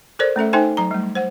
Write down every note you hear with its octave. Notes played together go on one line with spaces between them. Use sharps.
A4 A#4 C5 D5
A3 C#4 A4 E5
D#4 A4 C5 E5 G5 G#5
F#3 A#5
G3 A3
C5 F#5